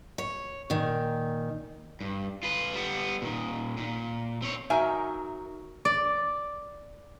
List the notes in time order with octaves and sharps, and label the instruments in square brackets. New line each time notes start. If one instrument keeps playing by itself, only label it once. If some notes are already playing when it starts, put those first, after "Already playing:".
[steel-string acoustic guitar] C#5
A#2 D#3
[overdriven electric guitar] G2
F4 B4
G3 B3
A#2 D#3
A#2
C4 C#5
[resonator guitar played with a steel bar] F#3 D#4 A#4 E5 G#5
[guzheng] D5